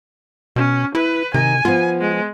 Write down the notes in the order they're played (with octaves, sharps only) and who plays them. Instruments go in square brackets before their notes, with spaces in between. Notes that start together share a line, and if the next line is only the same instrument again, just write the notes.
[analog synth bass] B2 [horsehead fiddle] C#4
[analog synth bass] E4 [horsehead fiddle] B4
[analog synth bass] C3 [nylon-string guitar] D#3 [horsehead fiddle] G#5
[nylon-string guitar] F3 B3 [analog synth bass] F4
[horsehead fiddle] G#3